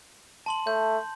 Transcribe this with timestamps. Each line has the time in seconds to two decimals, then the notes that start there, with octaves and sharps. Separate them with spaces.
0.46 A5 C6 F#7
0.67 A3 G6